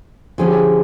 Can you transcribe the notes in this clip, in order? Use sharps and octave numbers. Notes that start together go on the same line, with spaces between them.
D3 F3 A3 C#4 G#4
G4
G#4